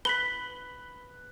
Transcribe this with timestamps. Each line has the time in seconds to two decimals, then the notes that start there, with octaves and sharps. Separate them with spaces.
0.05 B4 B6 F#7 G7